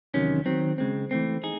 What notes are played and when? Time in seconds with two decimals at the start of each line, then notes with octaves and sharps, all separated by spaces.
0.14 E2 C3 D#3 F#3 C#4
0.46 D#3 F#3 C4
0.78 C#3 G#3 C4
1.11 E3 A3 C4
1.43 D#4 G#4